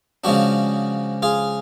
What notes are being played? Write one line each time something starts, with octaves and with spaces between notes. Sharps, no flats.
C#3 F3 G#3 D4 F#4
F4 G#4